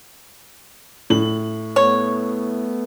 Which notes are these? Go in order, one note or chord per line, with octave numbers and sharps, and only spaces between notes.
A2 F#7
A3 B3 C#5